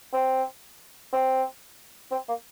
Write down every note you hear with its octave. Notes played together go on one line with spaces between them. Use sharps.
C4
C4
C4
A#3